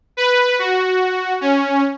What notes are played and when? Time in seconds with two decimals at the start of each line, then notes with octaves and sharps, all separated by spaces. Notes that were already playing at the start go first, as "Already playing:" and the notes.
0.17 B4
0.59 F#4
1.41 C#4